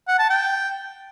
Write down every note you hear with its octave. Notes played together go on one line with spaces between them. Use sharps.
F#5
A5
G5